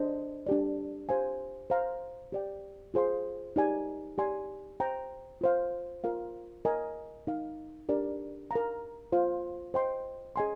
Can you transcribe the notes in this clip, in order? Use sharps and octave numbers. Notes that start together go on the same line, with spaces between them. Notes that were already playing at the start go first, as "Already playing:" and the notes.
Already playing: D4 G#4 C5 D#5
D4 G4 D5
G4 C5 F5 G#5
C5 F5 A#5
G4 D5 G5
F4 G#4 C5 F5 C6
D#4 G4 A#4 D5 G#5
G4 D5 G#5 C6
C5 G5 A#5
F4 C5 F5
F4 A#4 F5
A#4 D#5 G#5
D#4 A#4 F5
D4 G4 A#4 D5
A#4 F5 A#5
F4 C5 F5
C5 D#5 G5 C6
G#4 D#5 G#5 C6